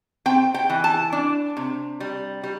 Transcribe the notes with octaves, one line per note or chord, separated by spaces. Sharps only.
C4 G5
G5
E3
A5
D4
C3
G3
G3